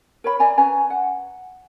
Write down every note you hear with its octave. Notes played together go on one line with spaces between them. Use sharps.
A#4 C#5 B5
D5 E5 G#5 A#5
C#4 B4 G#5 A#5
F#5